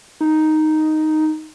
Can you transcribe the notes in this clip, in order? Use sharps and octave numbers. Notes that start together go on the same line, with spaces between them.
D#4